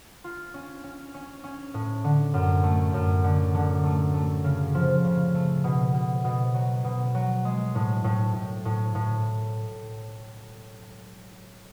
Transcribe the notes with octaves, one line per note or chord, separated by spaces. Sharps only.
F4
C#4
C#4
C#4
C#4
A2
D3
F#2
A3
F#2
D3
D3
A3
A3
C#3
F3
C#3
A3
B2
B2
B2
F#3
B2
F#3
G#3
A2
A2
A2
A2
A2